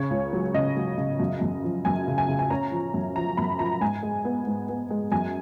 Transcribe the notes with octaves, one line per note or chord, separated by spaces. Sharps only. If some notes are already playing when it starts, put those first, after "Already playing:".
Already playing: C#3 C#5
C#2
F#3
C#3 D#5
F#3
C#3
F#2
F#2
F3
F#2 G#5
C#3
G#5
C#3
G#5
C#4 A#5
F3
F#2
F3 A#5
F#2 B5
F3 A#5
G#2 G#5
G#3
B3
G#2
B3
G#3
F#2 G#5